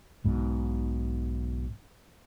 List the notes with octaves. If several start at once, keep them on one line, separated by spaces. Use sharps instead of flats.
B1 G#2 B2